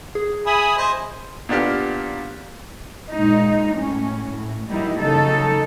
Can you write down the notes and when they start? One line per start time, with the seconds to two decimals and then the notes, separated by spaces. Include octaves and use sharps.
0.15 G#4
0.46 E5 G#5 B5 D#6
0.78 C5 D#5 G#5
1.49 A#2 B3 D4 G4 F6
3.12 A#2 G#3 D#4
3.75 A2 C#4
4.28 A2
4.70 F#3 G3 A#3 D#4 E4
5.00 C#3 F#3 D#4 A4